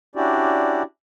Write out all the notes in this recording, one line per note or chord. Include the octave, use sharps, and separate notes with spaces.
C#4 D4 E4 F#4 G4 D5